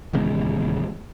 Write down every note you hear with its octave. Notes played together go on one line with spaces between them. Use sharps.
D#1 E2 C#3 G#3